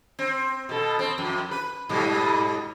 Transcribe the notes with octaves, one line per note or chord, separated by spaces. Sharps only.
C4
B2 A4
C4
F2
B4
G#2 B2 G3